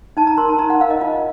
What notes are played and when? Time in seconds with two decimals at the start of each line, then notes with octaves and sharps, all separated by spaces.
0.17 D#4 A5
0.27 A#5
0.38 A#4 C6
0.49 A5
0.59 D#4 A#5
0.70 F#5
0.81 A#4 F5
0.90 D#5
1.01 F4